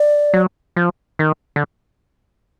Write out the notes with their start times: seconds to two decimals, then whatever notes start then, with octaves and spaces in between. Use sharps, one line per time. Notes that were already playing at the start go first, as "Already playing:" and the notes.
Already playing: D5
0.33 F#3
0.76 F3
1.19 D#3
1.56 D3